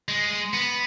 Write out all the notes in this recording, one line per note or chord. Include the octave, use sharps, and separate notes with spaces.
G#3
B3